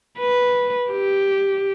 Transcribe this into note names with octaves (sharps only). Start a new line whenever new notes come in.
B4
G4